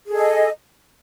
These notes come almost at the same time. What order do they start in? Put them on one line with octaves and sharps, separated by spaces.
G#4 A4 D#5